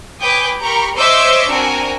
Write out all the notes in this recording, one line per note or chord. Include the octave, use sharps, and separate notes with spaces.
B4 C#5 G5 G#5 D6 D#6
G4 A#4 A#5 B5 C#6
C5 C#5 D#5 E5 D6 E6
C4 D4 F#4 A#4 G#5